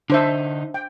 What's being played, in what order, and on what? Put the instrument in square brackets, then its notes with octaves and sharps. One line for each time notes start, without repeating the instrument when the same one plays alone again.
[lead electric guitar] D3 D#4 [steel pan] D4 C5 E5
[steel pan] G5